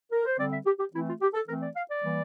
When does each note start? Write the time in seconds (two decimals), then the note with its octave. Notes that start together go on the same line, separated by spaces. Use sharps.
0.11 A#4
0.25 C5
0.39 D3 G3 C4 D5
0.52 E5
0.65 G4
0.79 G4
0.93 E3 A3 C4 E4
1.07 F4
1.21 G4
1.34 A4
1.48 E3 A3 C4 A#4
1.61 D5
1.76 F5
1.89 D5
2.02 E3 G3 A#3